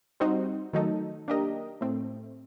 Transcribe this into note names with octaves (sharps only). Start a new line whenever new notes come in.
G3 C4 D#4 F#4 C5
D#3 F#3 A3 D#4 A4
A#3 D4 G4 A#4 D#5
A2 A3 C4